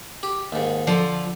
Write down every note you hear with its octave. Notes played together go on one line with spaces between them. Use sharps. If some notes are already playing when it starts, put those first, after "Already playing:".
G4
D#2 G#2
D3 F3 A4